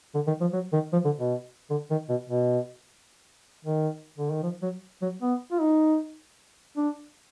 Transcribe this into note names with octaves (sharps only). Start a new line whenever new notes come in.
D3
D#3
F3
F#3
D#3
F3
D3
B2
D3
D#3
B2
B2
D#3
D3
D#3
F3
F#3
F#3
B3
F4
D#4
D4